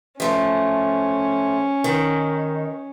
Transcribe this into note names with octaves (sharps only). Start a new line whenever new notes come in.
F3 A3 C#4
D#3